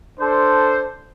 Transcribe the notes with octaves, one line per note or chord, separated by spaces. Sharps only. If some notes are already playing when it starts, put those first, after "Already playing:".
D4 A4 C5